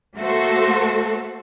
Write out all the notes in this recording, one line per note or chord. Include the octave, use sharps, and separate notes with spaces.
A3 A#3 F#4 A4 C5